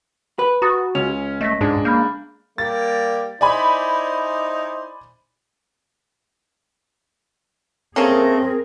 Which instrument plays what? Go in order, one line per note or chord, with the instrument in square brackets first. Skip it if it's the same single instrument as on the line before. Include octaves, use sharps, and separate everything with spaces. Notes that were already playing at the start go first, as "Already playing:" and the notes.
[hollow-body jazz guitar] B4
[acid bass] F#4 [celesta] A#5 D#6 A6
[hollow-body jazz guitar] C#2 [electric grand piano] C#4 [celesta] F7
[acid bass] A3 [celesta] D#5 A#6 B6
[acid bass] G#2 [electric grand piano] G#3 D4 [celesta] A5
[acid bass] A#3 [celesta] B5 F6 G6
[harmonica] G3 A#3 D5 [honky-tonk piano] A6
[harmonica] D#4 E4 C5 [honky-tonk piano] D5 G#5 B5
[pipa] A3 A#3 C#4 [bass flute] C4 [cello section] G#4 A#4